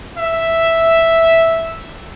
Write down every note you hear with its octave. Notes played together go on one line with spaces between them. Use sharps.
E5